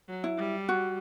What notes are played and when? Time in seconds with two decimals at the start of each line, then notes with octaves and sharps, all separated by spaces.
0.08 F#3
0.24 E4
0.38 G3
0.69 F#4